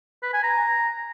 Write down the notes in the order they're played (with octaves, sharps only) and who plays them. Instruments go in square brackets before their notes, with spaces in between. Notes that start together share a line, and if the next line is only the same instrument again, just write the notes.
[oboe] B4
G#5
A#5